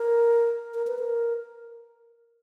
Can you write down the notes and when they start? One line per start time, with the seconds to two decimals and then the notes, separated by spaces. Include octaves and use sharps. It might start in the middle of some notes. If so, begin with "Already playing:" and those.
Already playing: A#4
0.74 A#4
0.87 B4
0.99 A#4